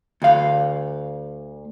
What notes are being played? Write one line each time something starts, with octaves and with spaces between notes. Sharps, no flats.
D2 F5